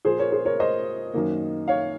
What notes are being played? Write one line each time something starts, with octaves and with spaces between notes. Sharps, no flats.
A#2 F3 A#3 G#4 C5
A#4 C#5
G#4 C5
A#4 C#5
C5 D#5
F#2 D#3 A#3
C#5 F5